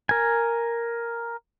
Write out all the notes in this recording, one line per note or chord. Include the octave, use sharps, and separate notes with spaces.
A#4 G#5